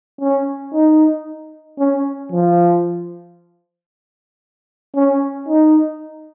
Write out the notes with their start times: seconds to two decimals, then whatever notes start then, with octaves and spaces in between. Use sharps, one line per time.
0.21 C#4
0.73 D#4
1.79 C#4
2.32 F3
4.95 C#4
5.49 D#4